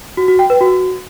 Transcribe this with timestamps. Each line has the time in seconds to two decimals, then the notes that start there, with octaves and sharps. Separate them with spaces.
0.17 F#4
0.28 F#4
0.39 G5
0.50 B4
0.61 F#4